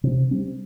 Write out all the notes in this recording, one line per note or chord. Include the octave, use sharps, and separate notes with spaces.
C3
G3 C4